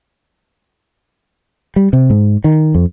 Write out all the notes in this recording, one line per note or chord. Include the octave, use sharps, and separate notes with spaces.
G3
C3
G#2
D#3
F2